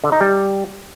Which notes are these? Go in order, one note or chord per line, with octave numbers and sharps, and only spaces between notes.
D3
D#4
G3